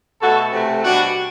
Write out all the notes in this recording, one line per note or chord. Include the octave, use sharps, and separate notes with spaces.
B2 A3 F#4 A4
C3 E3 A3
B2 G3 D4 F#4